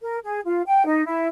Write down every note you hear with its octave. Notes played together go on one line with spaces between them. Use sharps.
A#4
G#4
F4
G5
D#4
E4